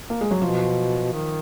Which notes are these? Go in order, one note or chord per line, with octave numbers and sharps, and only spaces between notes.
A#3
G#3
F#3
B2 F3
D#3